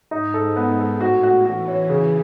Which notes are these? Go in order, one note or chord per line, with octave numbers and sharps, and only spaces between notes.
G#2 D#4
A4
G#2 B3
A4
A2 F#4
F#4
E3 F#4
C#5
C#3 E3